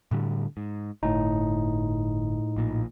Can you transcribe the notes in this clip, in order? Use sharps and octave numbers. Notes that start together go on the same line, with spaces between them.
A2 D3 G3
G#2
G1 A2 D#4
A#1 A#2